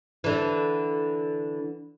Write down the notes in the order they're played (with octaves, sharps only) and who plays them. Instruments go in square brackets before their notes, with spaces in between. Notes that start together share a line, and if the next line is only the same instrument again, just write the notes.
[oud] D3 E3